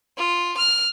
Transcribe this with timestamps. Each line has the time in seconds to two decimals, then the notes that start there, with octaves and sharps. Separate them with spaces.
0.17 F4
0.58 F6